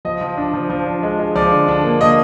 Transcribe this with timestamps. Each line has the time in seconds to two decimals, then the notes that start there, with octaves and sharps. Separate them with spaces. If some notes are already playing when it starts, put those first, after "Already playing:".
0.05 F3 D#5
0.21 F3
0.37 D4
0.54 F3
0.70 F3
0.86 D4
1.03 G#3
1.19 G#3
1.35 F3 D5
1.52 D3
1.68 D4
1.84 A#3
2.01 A#3 D#5